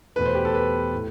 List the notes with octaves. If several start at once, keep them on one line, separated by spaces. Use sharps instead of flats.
E2 B2 A3 B4
C5
G4
A4
B4
A2